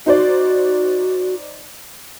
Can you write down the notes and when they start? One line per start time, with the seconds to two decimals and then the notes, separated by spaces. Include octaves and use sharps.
0.06 D#4 F#4 C5 D5